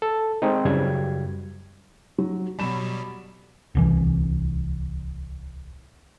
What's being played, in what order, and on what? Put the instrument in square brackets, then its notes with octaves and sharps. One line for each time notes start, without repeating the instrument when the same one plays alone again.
[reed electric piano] A4
G#3 C4 D#4
F#2 C#3 G3 G#6
[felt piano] F#3
[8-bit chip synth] B2 F#3 G3 [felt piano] B5 E7
[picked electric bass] D1 C2 E3